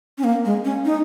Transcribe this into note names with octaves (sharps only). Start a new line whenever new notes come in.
C#4
A#3
G#3
C#4
D#4